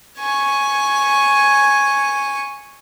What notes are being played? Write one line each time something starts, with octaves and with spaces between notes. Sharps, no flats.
G#5 C#6